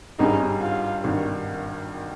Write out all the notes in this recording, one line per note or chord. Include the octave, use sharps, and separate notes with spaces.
G#1 G2 G3 C#4 D#4 G#4
F4
G#1 G2 D#3